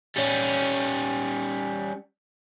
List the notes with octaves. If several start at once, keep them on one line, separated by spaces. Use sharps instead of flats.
G3 C#4